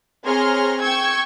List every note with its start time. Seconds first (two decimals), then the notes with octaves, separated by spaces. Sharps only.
0.24 C4 G#4 C#5 A#5 C6 F6
0.82 G5 C#6 E6 G#6